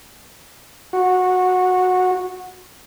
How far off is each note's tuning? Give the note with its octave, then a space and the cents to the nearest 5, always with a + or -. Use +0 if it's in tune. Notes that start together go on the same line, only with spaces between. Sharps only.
F#4 -15